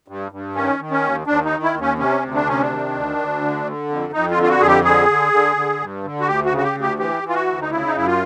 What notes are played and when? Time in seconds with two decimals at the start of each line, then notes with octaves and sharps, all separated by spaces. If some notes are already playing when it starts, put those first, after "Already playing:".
0.08 G2
0.32 G2
0.55 D#3 C#4
0.79 D#3
0.91 C#4
1.03 D#2
1.27 D#2 D4
1.45 D#4
1.50 D#3
1.63 E4
1.74 D#2
1.81 C#4
1.99 C3 C#4
2.22 D2
2.34 D4
2.46 C3 C#4
2.62 D4
2.70 D#3
2.94 D2
3.18 D2
3.41 D3
3.66 D3
3.89 F2
4.13 F2 D#4
4.31 F4
4.37 D3
4.43 F4
4.49 F#4
4.60 F2 G#4
4.67 G4
4.85 D3 G#4
5.09 D3
5.32 D3
5.56 D3
5.80 G2
6.04 D3
6.21 F#4
6.28 D2 G4
6.45 F#4
6.51 C#3
6.57 F#4
6.63 G4
6.75 D2
6.81 G4
6.99 E3 G4
7.23 E3
7.29 F4
7.35 F#4
7.47 D2
7.61 D#4
7.71 C#3 E4
7.86 D#4
7.95 F#2 E4
8.07 F4